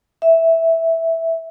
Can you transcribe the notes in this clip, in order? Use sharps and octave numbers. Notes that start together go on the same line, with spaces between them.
E5